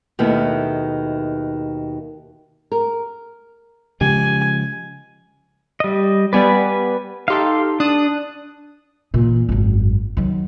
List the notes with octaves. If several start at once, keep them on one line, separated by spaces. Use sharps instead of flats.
D#2 B2 D#3 A3 B3 E4
A#4
C#3 F3 G#3 G4 G#5
G3 D#5
G3 B3 B4 D5 G#5
D#4 G4 A4 F5 C6
D4 A5 D#6 F#6
A#2 E3
G#1 F#2
D#3 F#3